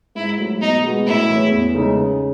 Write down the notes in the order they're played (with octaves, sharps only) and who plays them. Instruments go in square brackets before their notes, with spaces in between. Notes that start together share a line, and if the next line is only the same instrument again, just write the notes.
[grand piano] G#2 [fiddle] E4
[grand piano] F#3 A3
[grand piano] B2 [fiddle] D#4
[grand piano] G#3 B3 F#4
[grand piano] A2 [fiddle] E4
[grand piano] E3 A3 C#4 G#4
E2
C#3 G#3 D#4 A4
C#3